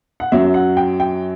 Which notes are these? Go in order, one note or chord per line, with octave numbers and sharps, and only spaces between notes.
F#5
F#2 F#3 E5
F#5
G5
G5